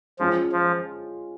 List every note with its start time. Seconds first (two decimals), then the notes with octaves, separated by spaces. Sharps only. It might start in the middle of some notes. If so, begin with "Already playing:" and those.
0.19 F3 G#3 C#4 F4
0.52 F3